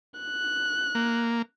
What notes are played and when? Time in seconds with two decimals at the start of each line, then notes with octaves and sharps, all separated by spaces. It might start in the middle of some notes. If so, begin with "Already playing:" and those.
0.21 F#6
0.95 A#3